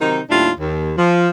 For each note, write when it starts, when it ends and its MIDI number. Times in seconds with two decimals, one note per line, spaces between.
0.01 0.20 48
0.01 0.20 51
0.01 0.20 54
0.01 0.20 60
0.01 0.20 63
0.30 0.51 39
0.30 0.51 45
0.30 0.51 55
0.30 0.51 62
0.30 0.51 64
0.30 0.51 65
0.60 0.92 39
0.97 1.29 53